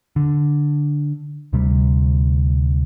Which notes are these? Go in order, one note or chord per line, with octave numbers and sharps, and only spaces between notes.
D3
D2 C3 G3